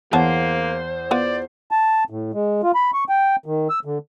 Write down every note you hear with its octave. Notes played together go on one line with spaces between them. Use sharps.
E2 A#3 B3 C5 C#5 F#5 A5
B3 F4 D5
A5
A2
G#3
F4
B5
C#6
G5
D#3
E6
D3